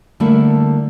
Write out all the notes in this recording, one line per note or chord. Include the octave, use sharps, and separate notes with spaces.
D3 G3 A3 A#3 E4